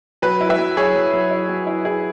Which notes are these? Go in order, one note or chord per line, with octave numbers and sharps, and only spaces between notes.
F#3 B4
E4
B4 E5
F#3
F#3 G#4 C#5
F#3
F#3
E4
F#3
E4
E4 G#4